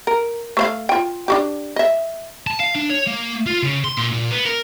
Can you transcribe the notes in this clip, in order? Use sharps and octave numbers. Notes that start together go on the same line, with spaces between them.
A#4
A3 C5 F5
F4 G5
D4 F#4 G4
D#5 E5
A5
F5
D4
C#5
A#3
F4
C#3
C6
A#2
A#2
B3
A#4